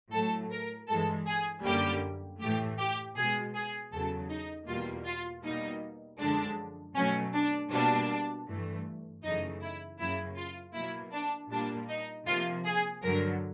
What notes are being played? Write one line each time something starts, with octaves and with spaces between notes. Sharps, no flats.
A2 F#3 A3 A4
A#4
G2 E3 G#3 A4
G#4
F#2 D3 G3 A#3 G4
A2 E3 A3 G4
G4
B2 G#3 G#4
G#4
E2 C#3 F#3 A4
D#4
E2 B2 G3 A#3 F4
F4
B2 G3 A#3 D#4
F#2 D3 F3 G#3 D4
B2 F#3 A3 C#4
D4
B2 G3 A#3 D4
G2 E3 A3
F#2 C#3 E3 A3 D#4
E4
F#2 C#3 F#3 A#3 E4
F4
B2 F#3 A#3 E4
D4
A#2 G3 A#3 D4
D#4
C3 F3 A#3 F4
G#4
G2 D3 F#3 A#4